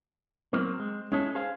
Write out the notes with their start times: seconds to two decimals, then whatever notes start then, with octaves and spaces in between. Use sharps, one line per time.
0.53 F#3 A#3 C4
0.80 G#3
1.12 G#3 C#4 E4 A4
1.35 G#4 C5 F5